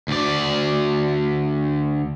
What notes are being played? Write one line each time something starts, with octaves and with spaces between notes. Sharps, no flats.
D2 D5